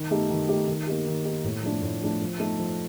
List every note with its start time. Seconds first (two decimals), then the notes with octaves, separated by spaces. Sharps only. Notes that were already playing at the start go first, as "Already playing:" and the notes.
Already playing: D#3
0.11 A3 D#4 G4
0.30 D#3
0.48 A3 D#4 G4
0.68 D#3
0.87 A#3 D#4 G4
1.06 D#3
1.25 A#3 D#4 G4
1.44 A2
1.63 F3 A3 D4
1.82 A2
2.02 F3 A3 D4
2.22 F3
2.40 A3 D#4
2.59 F3